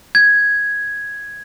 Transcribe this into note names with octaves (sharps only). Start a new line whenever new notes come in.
G#6